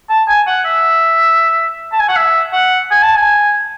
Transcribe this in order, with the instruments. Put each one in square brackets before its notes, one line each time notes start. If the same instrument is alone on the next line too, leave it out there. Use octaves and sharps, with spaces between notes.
[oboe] A5
G#5
F#5
E5
A5
G#5
F#5
E5
F#5
G#5
A5
G#5